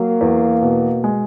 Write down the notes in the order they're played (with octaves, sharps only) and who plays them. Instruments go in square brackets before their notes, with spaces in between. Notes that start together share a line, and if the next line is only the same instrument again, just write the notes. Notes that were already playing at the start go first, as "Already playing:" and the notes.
Already playing: [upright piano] F#3 [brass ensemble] A#3
[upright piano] E2
B2
G#3